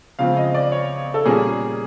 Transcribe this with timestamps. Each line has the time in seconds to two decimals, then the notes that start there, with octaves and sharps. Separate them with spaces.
0.19 C#3 F3 G#3 C4 F5
0.37 D#5
0.54 D5
0.72 C#5
1.14 A4
1.25 A#2 G3 A#3 C#4 G#4